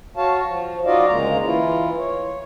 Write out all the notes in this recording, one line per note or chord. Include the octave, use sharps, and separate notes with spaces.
F#4 C#5 F5 A5
F3
D#4 F4 F#4 D5 D#5 F5
D2 C#3 G#3 A#3 A#5
E3 E4 F4
C#5